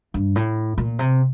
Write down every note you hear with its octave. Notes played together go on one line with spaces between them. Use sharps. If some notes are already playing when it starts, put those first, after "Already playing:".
G2
A2
A#2
C3